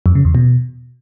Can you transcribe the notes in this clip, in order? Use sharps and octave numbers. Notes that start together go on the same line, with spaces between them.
F2
C#3
E2
B2